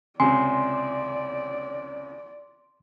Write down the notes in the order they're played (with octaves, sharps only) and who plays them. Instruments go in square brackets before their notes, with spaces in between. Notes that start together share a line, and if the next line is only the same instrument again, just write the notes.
[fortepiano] C#2 C3 [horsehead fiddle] D5 [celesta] G#5 [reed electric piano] C6